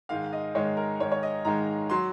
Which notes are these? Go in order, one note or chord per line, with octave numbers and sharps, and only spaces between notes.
G#2 D#3 G#3 F5
D#5
G#2 D#3 G#3 C#5
A#4
G#2 D#3 G#3 C#5
C#5
D#5
G#2 D#3 G#3 A#5
F#3 C6